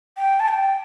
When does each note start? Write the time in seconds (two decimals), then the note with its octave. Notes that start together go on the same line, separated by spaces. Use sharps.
0.17 G5
0.40 A5
0.48 G5